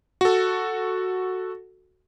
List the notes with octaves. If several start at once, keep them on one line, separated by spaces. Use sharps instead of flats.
F#4 A4